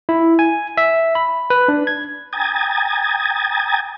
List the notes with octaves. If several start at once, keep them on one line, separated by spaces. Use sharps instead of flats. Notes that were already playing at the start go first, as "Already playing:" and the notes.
E4
G#5
E5
B5
B4
D4
G#6
G5 G#5 A#5 D#6 G#6 A6